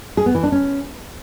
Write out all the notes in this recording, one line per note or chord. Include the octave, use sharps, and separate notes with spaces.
G#4
B3
E3
D4
C#4